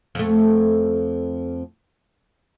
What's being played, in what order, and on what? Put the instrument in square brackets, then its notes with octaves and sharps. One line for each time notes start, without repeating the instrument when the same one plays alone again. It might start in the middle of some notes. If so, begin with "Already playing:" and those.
[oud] F2 A3